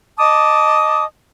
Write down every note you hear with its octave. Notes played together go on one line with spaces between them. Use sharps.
D#5 A5 D6 D#6